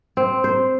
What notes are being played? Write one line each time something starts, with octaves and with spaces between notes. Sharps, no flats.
C4
C5